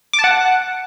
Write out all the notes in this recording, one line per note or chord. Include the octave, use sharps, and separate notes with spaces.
D6
A5
F#5